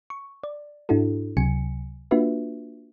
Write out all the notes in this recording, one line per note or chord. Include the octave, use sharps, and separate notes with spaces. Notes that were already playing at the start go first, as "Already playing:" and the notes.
C#6
D5
G#2 D4 E4 F#4 A4
C#2 C3 F#3 G#5 C#7
A#3 D4 F4 F#4 B4 E5